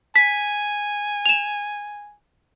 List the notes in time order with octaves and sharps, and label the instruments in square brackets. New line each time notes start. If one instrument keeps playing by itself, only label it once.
[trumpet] G#5 [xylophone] B6
[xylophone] E7 F7